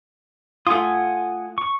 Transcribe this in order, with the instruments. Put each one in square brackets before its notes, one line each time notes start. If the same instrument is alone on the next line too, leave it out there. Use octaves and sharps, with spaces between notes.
[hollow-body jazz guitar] A3 F4 [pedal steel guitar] F#5 G#5 D#6
[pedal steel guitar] C#6